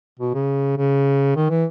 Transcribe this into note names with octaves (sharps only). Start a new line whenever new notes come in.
B2
C#3
C#3
D#3
E3